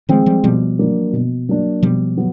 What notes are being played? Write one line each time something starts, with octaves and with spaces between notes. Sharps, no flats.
D#3 F3 G#3 C4
F3 G3
B2 F3 G3
F#3 A#3 D4
B2
F#3 A#3 D4
B2 F3 G3
F#3 B3